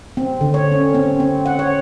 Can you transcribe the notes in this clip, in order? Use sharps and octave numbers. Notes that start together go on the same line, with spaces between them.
C4
D3
C#5
C#4
C4
C4
F#5
C#5